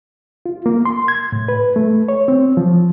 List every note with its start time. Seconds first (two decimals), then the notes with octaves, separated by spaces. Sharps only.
0.46 F4
0.66 A#3
0.85 C6
1.08 G#6
1.32 A2
1.48 B4
1.76 A3
2.09 C#5
2.28 C4
2.57 F3